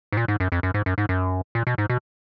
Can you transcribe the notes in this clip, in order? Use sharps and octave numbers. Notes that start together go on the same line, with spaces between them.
G#2
A#2
G#2
F#2
F2
F#2
G#2
F#2
G#2
F#2
A#2
B2
G#2
B2